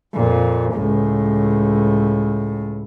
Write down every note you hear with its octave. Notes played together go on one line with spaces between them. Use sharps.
F2 A#2
C#2 A2